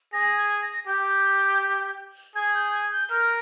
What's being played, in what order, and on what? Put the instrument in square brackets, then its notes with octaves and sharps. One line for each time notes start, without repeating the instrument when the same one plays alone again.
[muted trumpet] G#4 [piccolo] A#6
[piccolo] G#6
A#6
[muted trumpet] G4 [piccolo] G6
[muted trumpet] G#4 [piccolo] G#6
[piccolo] G6
G#6
G6
[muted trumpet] A#4 [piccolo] F6